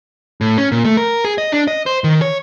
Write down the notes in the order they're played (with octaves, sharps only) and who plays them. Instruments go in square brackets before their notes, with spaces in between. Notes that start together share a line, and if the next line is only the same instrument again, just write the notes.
[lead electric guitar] A2
C#4
A#2
A3
A#4
G#4
D#5
D4
D#5
C5
D#3
C#5